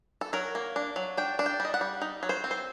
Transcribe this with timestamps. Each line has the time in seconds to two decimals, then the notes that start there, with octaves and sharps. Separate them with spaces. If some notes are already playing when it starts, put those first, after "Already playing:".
0.21 A4
0.33 F#3 A#4
0.55 A#3
0.76 D4
0.96 F#3
1.17 D4 G5
1.39 D4
1.46 G5
1.60 G3 D#5
1.74 F#5
1.81 G3
2.02 D#4
2.23 F#3
2.29 C5
2.44 C4
2.51 C5